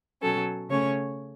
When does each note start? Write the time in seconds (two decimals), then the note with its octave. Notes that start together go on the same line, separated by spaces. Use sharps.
0.22 B2 F#3 C#4 A4
0.70 C#3 A3 C#4 C#5